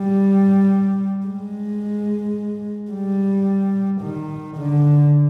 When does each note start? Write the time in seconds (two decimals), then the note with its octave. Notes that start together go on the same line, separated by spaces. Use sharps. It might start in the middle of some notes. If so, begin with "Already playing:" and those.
Already playing: G3
1.26 G#3
2.91 G3
4.01 D#3
4.57 D3